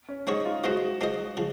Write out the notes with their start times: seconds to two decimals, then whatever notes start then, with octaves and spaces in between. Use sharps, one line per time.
0.08 C#4
0.27 G#3 C4 D#4 F#4 C#5
0.45 F4
0.64 G#3 C4 F4 F#4 C5 D#5
1.01 G#3 C4 F4 C5 D#5
1.37 C#3 F3